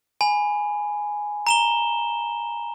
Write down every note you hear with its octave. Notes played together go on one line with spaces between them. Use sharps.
G#5 B5
A#5 E7 G7